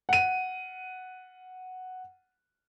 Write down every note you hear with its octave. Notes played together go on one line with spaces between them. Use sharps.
F#5 D#7